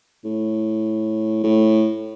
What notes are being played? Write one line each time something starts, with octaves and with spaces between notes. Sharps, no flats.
A2
A2